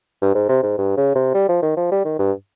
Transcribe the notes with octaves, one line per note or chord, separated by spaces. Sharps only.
G2
G#2
C3
G#2
G2
C#3
C3
G3
F3
D#3
F3
G3
D#3
G2